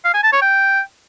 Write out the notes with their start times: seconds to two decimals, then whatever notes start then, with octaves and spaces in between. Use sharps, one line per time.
0.05 F5
0.14 G#5
0.23 A5
0.33 C#5
0.42 G5